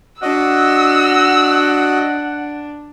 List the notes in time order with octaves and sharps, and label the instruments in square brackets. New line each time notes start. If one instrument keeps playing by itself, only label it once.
[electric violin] D4 [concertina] F#4 D#5 [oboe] F#5 [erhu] E6